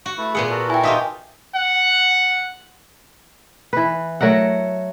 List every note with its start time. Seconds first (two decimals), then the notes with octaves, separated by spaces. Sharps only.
0.06 F#4 C#6
0.18 A3 E4 B4
0.35 A#2 B3 G#4 F#5
0.51 F#4 A4 A#4
0.70 E4 G5 G#5
0.83 D#4 F4 G4 D#5 E5 D#6
1.55 F#5
3.73 E3 B4
4.21 F#3 A3 A#4 F#5